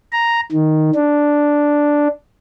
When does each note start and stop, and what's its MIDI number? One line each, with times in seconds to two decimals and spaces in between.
0.12 0.41 82
0.52 0.90 51
0.95 2.08 62